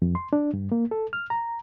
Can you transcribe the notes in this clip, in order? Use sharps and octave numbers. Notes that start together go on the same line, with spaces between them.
F2
C6
D4
G2
A#3
A4
F6
A#5